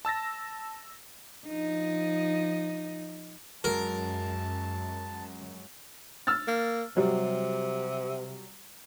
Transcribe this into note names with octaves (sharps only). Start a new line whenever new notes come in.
A5 E6 A6 A#6
F3 D#4
F#2 F#3 G#3 A#4 A5
E6 F6 A6
A#3
C3 F#3 G3